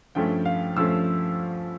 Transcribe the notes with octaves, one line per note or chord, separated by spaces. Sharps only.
G2 F3 A3 C#4 G5
F5
G2 F3 A3 C#4 E6